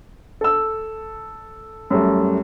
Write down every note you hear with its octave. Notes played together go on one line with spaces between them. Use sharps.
A4 E6
F#2 G3 A3